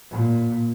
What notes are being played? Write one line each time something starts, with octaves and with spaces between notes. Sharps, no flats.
A#2